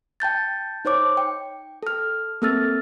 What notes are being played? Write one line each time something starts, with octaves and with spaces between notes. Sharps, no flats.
G5 A5 G6 A6
D#4 C5 C#5 D6
G5
A4 F6
A#3 C4 A4 E6 F6 A6